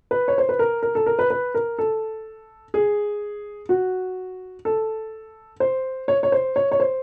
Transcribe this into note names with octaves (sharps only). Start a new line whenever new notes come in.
B4
C#5
C5
B4
A#4
A#4
A4
A#4
B4
B4
A#4
A4
G#4
F#4
A4
C5
C#5
C#5
C5
C#5
C#5
C5